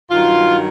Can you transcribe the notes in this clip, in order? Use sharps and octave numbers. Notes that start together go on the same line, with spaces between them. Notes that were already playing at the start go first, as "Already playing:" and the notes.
G2 D#3 F#3 F4